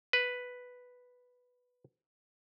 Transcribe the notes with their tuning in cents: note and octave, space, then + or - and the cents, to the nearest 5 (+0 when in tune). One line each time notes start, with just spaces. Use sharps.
B4 +0